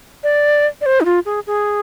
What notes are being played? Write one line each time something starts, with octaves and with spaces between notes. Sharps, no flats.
D5
D5
C5
D#4
F4
G#4
G#4